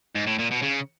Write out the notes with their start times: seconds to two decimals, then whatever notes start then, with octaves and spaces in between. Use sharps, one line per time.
0.16 G#2
0.27 A2
0.39 A#2
0.51 B2
0.63 C#3